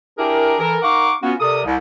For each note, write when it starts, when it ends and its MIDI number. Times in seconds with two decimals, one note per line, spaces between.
0.18 0.55 62
0.18 0.55 64
0.18 0.55 67
0.18 0.55 68
0.18 0.55 70
0.60 0.77 52
0.60 0.77 69
0.60 0.77 70
0.82 1.12 63
0.82 1.12 70
0.82 1.12 77
0.82 1.12 78
0.82 1.12 85
0.82 1.12 86
1.23 1.34 59
1.23 1.34 61
1.23 1.34 65
1.23 1.34 66
1.40 1.61 48
1.40 1.61 69
1.40 1.61 70
1.40 1.61 74
1.40 1.61 87
1.65 1.75 36